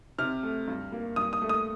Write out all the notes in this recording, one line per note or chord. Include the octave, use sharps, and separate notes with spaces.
C3 F6
A3
G2
A#3
G2 D#6
D#6
A3
D#6